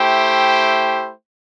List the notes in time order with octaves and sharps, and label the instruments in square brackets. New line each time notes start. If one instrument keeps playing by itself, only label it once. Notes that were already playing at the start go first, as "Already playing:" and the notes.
Already playing: [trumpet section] A3 E4 G4 C5 G5